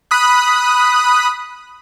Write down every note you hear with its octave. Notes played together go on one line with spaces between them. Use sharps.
B5 D#6 F#6